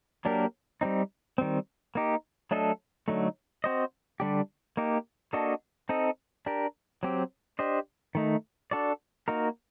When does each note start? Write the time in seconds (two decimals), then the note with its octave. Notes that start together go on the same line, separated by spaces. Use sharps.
0.25 F#3 A#3 D4 G4 A#4
0.81 G3 C4 D#4
1.38 D#3 G3 C4
1.95 A#3 D#4 G4
2.51 F#3 A3 D4 A4 D#5
3.08 D3 F#3 A3 D#4
3.64 C4 F#4 C5 D#5
4.20 D3 G3 D4 G4
4.77 A#3 D#4 G4
5.33 A#3 D4 F#4 A4 D#5
5.89 C4 D#4 A4 D#5
6.46 D4 G4 A#4
7.03 F#3 C4 G4
7.59 D4 G4 C5 D#5
8.15 D#3 A3 D#4
8.71 D4 F#4 A4 D5
9.28 A#3 D#4 F#4 A#4